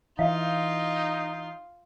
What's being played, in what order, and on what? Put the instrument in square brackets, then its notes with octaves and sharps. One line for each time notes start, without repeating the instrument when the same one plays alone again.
[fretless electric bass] E3 [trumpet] D#4 [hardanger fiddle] F4 [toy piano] E5 F5